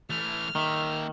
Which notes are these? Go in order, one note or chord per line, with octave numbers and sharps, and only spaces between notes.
E3 A3 F6
D#3 A#3 E5